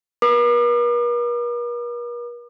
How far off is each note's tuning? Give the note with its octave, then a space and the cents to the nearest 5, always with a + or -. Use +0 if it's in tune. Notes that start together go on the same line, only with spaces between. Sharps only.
A#4 +45 D6 +40